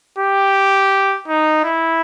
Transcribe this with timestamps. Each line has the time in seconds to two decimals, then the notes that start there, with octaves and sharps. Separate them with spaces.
0.18 G4
1.28 D#4
1.65 E4